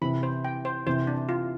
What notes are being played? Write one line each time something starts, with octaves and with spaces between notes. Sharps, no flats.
C3 E3 B5
C5
G5
C5
C3 E3 C5
D4
F4